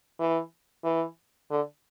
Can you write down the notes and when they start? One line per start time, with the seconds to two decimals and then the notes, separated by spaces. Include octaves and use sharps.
0.20 E3
0.84 E3
1.51 D3